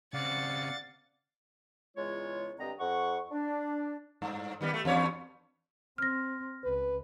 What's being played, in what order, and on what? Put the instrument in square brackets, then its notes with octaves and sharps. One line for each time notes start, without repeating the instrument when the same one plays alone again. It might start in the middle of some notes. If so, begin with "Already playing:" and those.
[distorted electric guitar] C#3 C4 [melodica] D5 F5 F#5 [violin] A6 C#7
[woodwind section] E2 C#3 G#3 F4 C#5
G2 D3 C4 D#5 A#5
F2 F#5 C#6
D4
[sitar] G2
D#3 G3 B3
A3
E2 G2 C#5
[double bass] C4 [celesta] F6 A#6
[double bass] C#2 [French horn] B4